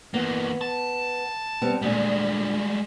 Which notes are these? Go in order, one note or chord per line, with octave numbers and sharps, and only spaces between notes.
E3 A#3 B3
A5
G3 B3 C4
D2 A#2 G3 G#3